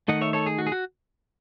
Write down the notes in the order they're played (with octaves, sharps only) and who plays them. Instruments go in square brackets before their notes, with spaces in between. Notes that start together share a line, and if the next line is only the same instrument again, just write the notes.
[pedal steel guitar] D#3 A3 D#4 D#5 F#5
C#5 E5
A4 C#5
G#4
F#4
G#4
F#4